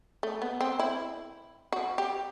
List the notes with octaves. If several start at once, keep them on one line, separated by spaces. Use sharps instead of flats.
A3
B3
C4
E4
F#4
G4